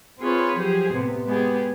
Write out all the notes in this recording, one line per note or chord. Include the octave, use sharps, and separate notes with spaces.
C4 F4 G#4 B4 C#5
F3 F#3 G4 G#4 C5
A2 C3 B3
G#3 B3 G4 G#4